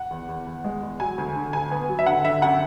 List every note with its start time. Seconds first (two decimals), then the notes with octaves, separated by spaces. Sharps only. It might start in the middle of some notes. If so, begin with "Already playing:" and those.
Already playing: F#5
0.11 E2
0.29 E2
0.46 E2
0.65 G#3
0.83 E2
1.00 F#3 G#5
1.18 D2
1.36 D3
1.53 D2 G#5
1.71 B3
1.89 F#3
1.99 E5
2.06 D3 F#5
2.25 D3 E5
2.42 F#2 F#5